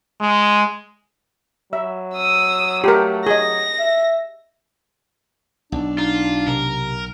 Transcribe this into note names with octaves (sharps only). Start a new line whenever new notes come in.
G#3
F#3 E5
D#6 E6
A3 G4 A#4
G#4 D#5 A#6
E5
B1 D4
D#4 F4
C3 A#4